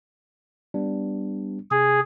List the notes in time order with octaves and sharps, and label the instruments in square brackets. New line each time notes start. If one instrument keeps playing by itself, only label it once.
[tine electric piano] G3 B3 D4
[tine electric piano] C3 [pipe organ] G#4